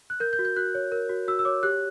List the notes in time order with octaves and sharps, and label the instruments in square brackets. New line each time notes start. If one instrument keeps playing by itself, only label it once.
[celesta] F#6
A#4 G6
G6
F#4
G6
F#4 F#6
C#5
A#4
F#4
F#4 E6
E6
C#5 D6
G4 F#6